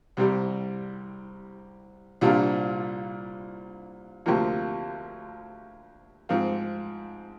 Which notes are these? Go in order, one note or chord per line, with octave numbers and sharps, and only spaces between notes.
C2 C3 G3
C2 A#2 G3 D4 F4
D2 C3 F3 A#3
G#2 F3 C4 F4